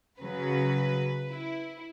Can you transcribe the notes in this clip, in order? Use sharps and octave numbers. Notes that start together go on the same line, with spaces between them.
C#3 F#3 B4
E4